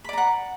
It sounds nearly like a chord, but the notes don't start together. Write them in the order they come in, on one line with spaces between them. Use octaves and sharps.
B5 D5 A#5 F#5